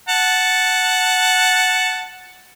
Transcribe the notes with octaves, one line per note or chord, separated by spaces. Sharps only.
F#5 A5